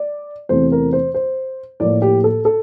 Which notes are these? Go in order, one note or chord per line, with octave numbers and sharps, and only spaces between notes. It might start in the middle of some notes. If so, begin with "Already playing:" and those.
Already playing: D5
E2 C3 E3 A3 C4 C5
A#4
C5
C5
A2 F3 A#3 D5
G4
A4
A4